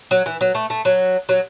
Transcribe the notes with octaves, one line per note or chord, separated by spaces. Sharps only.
F#3
E3
F#3
A3
A3
F#3
F#3